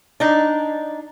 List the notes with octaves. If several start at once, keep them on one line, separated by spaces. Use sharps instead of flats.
D4 D#4